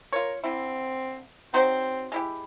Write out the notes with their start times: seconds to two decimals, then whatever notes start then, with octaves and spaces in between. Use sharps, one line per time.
0.13 F4 A#4 C#5
0.44 D3 C4 E4
1.54 F#3 C4 D#4 C5
2.12 G#3 E4 G4